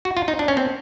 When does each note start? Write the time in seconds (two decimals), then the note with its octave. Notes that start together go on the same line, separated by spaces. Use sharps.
0.05 F#4
0.17 F4
0.28 D#4
0.39 D4
0.48 C#4
0.57 C4